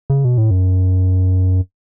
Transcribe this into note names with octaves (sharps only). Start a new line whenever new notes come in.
C#3
B2
A2
F#2